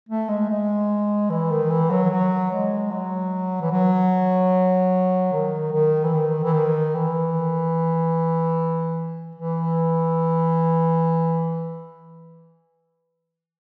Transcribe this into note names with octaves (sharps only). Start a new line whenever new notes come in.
A3
G#3
G#3
E3
D#3
E3
F#3
F#3
G#3
F#3
E3
F#3
D#3
D#3
E3
D#3
E3
D#3
E3
E3